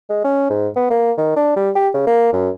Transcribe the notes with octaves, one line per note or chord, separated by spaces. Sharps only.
G#3
C#4
G#2
B3
A#3
D#3
D4
G3
G4
C#3
A#3
F#2